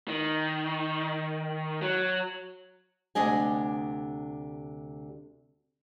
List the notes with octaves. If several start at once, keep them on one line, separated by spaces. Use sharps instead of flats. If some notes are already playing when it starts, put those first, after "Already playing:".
D#3
F#3
D2 C3 G3 D4 D#5 G#5